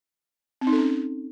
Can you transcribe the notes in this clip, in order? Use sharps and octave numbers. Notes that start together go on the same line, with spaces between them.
C4
D#4
A4
C#4